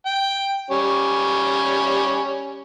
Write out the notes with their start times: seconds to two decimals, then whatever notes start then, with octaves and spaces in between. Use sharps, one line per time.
0.06 G5
0.70 G3 C#4